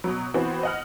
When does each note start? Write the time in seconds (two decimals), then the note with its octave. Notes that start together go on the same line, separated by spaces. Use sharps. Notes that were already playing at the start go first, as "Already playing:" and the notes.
0.04 B2 F#3
0.34 E3 B3 C4 F#4
0.63 D#5 F#5 F6